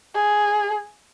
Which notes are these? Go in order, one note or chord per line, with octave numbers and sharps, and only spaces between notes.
G#4